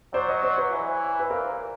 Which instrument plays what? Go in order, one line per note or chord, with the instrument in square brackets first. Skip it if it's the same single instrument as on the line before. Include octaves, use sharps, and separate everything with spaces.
[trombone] F#3 [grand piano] C5 D5
[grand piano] C#5 D#5
C5 D5
B4 C#5
[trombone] E3
[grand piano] B4
[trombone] A#2 [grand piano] A#4 C5